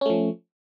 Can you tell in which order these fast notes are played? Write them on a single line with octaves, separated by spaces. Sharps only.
C#4 A3 F3